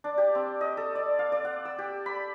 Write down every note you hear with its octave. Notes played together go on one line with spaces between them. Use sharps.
D4
G4
C4
D#5
A4
D5
F5
D5
F#5
E6
G4
B5